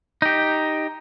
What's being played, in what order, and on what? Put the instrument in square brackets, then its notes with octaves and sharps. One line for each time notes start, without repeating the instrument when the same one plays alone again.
[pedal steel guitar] D#4 G4